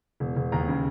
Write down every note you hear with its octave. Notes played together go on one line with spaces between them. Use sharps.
E1
E1
D#2 A#5
C#3